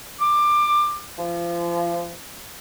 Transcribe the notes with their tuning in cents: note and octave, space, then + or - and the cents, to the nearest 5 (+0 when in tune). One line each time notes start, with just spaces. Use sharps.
D6 +20
F3 -30